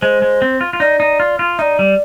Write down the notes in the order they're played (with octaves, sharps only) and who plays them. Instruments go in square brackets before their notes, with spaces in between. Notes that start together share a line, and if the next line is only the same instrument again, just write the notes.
[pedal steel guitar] G#3 [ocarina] C5
[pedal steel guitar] G#3
C4
F4
F4
[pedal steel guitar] D#4 [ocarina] D5
[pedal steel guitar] D#4
F4
F4
[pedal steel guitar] D#4 [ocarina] D5 E5
[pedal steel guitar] G3